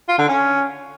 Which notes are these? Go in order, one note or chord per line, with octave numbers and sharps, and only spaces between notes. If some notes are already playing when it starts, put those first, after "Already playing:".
F4
D3
C#4